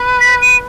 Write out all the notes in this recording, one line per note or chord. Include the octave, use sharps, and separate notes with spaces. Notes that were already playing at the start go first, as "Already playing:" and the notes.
Already playing: B4
B6
D#7